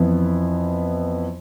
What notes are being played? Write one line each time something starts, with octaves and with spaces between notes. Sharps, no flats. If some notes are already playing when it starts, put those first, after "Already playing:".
Already playing: F2 E3 B3 E4